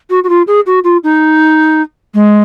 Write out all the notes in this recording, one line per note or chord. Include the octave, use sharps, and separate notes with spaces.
F#4
F#4
F4
G#4
F#4
F4
D#4
G#3